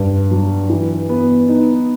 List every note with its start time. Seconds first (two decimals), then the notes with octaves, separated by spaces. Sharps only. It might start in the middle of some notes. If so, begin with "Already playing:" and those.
Already playing: G2
0.31 F#3
0.69 E3
1.09 B3
1.49 D#4